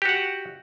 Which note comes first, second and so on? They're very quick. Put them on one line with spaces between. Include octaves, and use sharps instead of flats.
G4 F#4 F#5